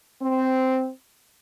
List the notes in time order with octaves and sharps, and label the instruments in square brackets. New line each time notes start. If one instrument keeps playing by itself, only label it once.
[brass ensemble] C4